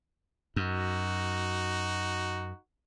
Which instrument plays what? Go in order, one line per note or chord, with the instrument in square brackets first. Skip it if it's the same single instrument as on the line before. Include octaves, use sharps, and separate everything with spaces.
[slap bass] F#2 [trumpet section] D#4 F#4